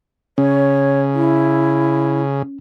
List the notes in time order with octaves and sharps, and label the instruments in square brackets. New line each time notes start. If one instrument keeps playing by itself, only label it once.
[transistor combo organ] C#3 [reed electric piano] C#4 [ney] C#5
[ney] E4